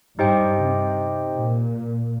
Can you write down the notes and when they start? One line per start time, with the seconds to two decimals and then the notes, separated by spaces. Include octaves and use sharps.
0.18 G2 D#4 G4 C5 D#5 G5
0.58 C3
1.34 A#2